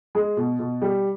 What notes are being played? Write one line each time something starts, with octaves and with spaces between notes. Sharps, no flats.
G#3
B2
B2
G3